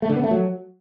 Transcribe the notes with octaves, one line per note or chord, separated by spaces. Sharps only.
A3
D3
B3
A3
F#3